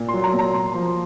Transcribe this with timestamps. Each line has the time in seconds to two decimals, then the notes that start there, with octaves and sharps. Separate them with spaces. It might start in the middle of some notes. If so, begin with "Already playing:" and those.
Already playing: A#2
0.09 C6
0.14 F#3
0.24 A#5
0.34 A#2
0.39 A#5
0.54 A#2 C6
0.74 F3